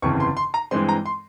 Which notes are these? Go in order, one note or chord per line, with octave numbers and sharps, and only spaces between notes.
G1 F2 C#3 E3 C#6
C6
C6
A#5
G2 E3 G#3 C4 C6
A#5
C6